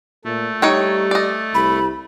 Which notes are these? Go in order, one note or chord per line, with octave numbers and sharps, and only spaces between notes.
A#2 A3
G3 D#4 C#5 G5
D5 D#5
C2 B5